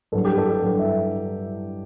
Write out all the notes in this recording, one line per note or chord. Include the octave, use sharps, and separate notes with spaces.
G2 F#3 A4
G4
A4
A4
G2 F#3
E5